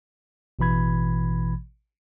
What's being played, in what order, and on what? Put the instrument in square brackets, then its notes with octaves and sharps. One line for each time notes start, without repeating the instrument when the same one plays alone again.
[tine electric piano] A1 B2 E3 B5 G#6